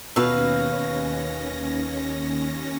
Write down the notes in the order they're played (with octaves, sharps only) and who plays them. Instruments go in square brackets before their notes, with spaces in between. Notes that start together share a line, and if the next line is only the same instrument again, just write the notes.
[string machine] D#2 C#4 A#6 [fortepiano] B2 E6 [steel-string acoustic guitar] B4 F5